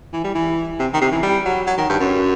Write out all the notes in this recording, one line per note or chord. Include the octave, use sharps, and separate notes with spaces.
E3
G3
E3
C3
D#3
C3
E3
G3
F#3
F#3
D#3
G2
F#2